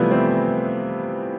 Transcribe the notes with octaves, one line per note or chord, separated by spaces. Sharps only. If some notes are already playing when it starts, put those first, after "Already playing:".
Already playing: C3 E3 F3 G3 A3 B3
A3 C4